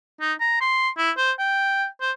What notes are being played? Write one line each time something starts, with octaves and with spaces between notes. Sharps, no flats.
D#4
A#5
C6
E4
C5
G5
C5